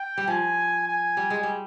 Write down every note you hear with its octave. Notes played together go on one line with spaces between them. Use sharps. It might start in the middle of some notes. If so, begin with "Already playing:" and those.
Already playing: G5
G3
F3 G#5
G#5
G3
G#3
G3